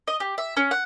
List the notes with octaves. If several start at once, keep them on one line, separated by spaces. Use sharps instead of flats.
D#5
G4
E5
C#4
F#5